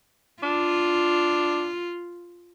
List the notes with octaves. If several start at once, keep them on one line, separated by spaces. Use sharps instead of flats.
D4 F4